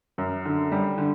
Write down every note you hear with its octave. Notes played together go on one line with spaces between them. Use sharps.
F#2
D3
G3
D3